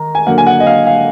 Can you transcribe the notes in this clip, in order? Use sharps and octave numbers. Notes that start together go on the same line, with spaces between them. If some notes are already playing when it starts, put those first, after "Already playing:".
Already playing: D#3 A#5
G#5
D3 F#3 A#3 F#5
G#5
F#5
D#5
F5
F5